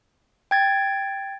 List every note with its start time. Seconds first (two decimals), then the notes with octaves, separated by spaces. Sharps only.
0.51 G5 G#6 A6